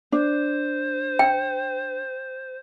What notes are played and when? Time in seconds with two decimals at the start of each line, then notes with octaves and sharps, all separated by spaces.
0.12 D4 C5
1.19 G5